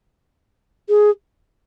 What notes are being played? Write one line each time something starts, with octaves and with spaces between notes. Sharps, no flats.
G#4